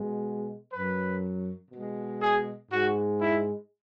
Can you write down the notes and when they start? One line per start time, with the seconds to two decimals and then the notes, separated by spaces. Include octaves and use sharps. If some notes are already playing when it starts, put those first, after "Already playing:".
Already playing: B2 G#3
0.72 F#2 F#3 B4
1.71 B2 G#3
2.21 G#4
2.70 G#2 G#3 F#4
3.20 E4